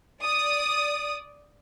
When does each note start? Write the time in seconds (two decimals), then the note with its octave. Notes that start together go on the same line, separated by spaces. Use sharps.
0.23 D5 D#6